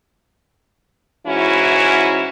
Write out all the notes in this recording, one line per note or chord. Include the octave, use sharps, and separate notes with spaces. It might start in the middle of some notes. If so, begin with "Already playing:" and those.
G#2 E3 C#4 E4 F#4